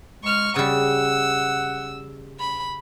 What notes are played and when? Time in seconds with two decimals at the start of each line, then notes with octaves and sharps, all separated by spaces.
0.24 G#3 C#6 F6
0.56 C#3 G3 F#5 E6
2.40 B5